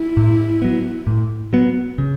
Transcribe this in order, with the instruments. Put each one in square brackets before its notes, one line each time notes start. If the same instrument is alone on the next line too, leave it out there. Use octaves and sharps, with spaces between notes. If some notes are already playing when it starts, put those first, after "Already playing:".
Already playing: [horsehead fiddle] E4
[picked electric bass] A2
F#3 B3
A2
F#3 B3
C#3